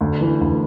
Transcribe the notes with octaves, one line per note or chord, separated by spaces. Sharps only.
D2
E3
D2